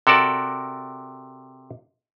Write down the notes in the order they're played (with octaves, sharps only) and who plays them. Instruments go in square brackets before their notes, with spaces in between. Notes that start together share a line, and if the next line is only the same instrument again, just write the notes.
[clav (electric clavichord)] C3 F#4 A4 A#4 D5 A5